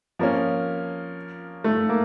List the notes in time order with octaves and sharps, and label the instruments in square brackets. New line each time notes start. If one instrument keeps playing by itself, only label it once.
[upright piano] F3 A#3 C#4
[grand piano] A3
A#3